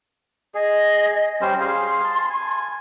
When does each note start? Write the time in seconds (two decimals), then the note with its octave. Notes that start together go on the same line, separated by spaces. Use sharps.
0.55 G#4 D#5
1.41 G3 C#4 C5
1.60 G#4 F5 C6
2.04 A5
2.30 G#5